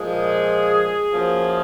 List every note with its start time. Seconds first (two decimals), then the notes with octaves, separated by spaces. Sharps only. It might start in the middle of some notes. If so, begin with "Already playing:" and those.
Already playing: A#2 F3 G#3 G#4
1.10 F#2 F3 A#3